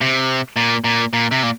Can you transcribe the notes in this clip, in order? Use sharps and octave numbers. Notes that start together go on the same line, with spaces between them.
C3
A#2
A#2
A#2
C3
A#2